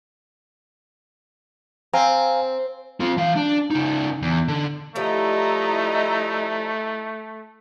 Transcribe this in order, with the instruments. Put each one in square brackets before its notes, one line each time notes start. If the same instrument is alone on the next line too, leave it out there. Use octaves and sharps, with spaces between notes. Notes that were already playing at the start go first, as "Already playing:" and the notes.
[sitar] C4 [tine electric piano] F5 G#5 A#5
[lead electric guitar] C4 F4
E3 F5
D4
C#3 D#4
E2
D3
[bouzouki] F3 G3 [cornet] A3 [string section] E4 D#5 A#5